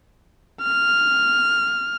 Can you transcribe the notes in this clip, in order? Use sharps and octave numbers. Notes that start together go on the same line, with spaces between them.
F6